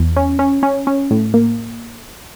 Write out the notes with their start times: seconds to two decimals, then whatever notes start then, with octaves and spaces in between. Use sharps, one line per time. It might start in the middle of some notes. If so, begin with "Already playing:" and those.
Already playing: E2
0.16 C#4
0.39 C#4
0.63 C#4
0.87 C#4
1.11 A2
1.34 A#3